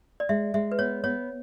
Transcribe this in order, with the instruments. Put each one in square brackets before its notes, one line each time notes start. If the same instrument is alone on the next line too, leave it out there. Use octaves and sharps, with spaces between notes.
[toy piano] D5
[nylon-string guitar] G#3 [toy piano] E5
[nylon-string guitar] G#3 [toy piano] E5
[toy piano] B4
[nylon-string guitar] B3 [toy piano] C#5
[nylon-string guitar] B3 [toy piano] C#5